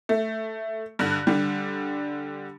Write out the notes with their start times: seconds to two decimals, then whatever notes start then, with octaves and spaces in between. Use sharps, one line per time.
0.09 A3
0.99 G2 D3 F#6
1.27 D3 G3